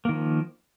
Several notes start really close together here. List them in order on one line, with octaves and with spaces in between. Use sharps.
A#3 D#3 F3